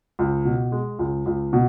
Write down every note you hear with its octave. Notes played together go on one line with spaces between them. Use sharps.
C#2
B2
G#3
C#2
C#2
B2